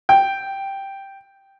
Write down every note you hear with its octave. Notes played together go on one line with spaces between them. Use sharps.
G5